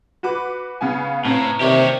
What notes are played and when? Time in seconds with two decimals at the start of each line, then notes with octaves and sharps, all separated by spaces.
0.23 F#4 B4 D6
0.81 C#3 B3 F5 G#5
1.25 A2 C4 C#4 B4 A#5
1.60 C3 D#3 G4 C#5 D5